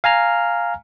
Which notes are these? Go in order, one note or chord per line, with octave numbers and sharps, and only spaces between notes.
F5 G#5 A#5 F6